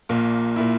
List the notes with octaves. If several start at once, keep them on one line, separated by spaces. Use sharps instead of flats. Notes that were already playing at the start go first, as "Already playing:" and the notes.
A#1 A#2 A#3
A#2 A#3 E4